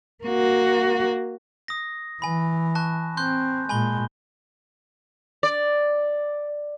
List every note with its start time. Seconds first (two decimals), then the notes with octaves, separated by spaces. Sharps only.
0.24 A#3 F#4
1.68 D#6 A#6
2.22 E3 G#5 B5
2.75 A5 C#6 F#6
3.17 C4 C6 F#6 G6
3.69 A#2 G#3 G#5 B5 G7
5.43 D5